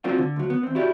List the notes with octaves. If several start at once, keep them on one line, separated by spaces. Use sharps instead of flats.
F#3 A#3 C4 D4 F4 F#4
D3
D2 F#3
B3
E2 C4
E4 F#4 G4 D5